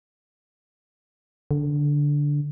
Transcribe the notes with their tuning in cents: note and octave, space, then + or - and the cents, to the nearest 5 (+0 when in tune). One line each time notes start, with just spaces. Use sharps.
D3 -10